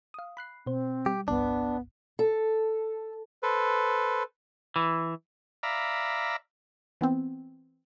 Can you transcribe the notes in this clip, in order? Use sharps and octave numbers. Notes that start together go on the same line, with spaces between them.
F5 D#6
B5 F#6 C7
B2 C4 C5
G3 G4
G1 C2 G2 B3 D4
A4
A4 B4 C5
E3
D5 E5 F5 A#5 B5
E3 B3 C4